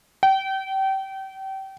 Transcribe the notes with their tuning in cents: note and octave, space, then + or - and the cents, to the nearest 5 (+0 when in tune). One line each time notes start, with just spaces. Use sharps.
G5 -30